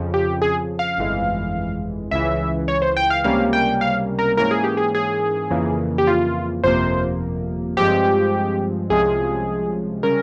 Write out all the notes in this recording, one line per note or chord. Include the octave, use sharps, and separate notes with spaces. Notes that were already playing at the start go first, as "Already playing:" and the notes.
Already playing: F2 C#3 F3
G4
G#4
F5
G1 F2 E3 G#3
C#2 C#3 E3 E5
C#5
C5
G5
F5
C#2 C3 G3 A#3 C#4 F5
G5
F5
A#4
G#2 E3 A#3 C#4 A#4
G#4
G4
G#4
G#4
F2 C#3 E3 A#3
G4
F4
G1 F2 C3 F3 A#3 C5
G2 F3 G#3 C4 G4
C2 C3 F3 G#3 C#4 G#4
C#3 G3 C#4 A#4